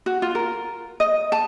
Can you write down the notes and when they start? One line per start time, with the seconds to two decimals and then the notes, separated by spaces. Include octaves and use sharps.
0.06 F#4
0.22 F4
0.35 A#4
1.00 D#5
1.32 A5